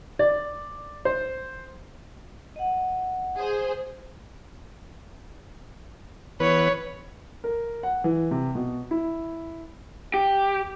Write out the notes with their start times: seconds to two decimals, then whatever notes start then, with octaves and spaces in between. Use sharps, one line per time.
0.19 D5
1.05 C5
2.56 D#5 F#5
3.36 G#4 C5
6.40 E3 B3 B4 C#5
7.44 A#4
7.83 F#5
8.04 E3
8.31 C3
8.55 B2
8.91 E4
10.14 G4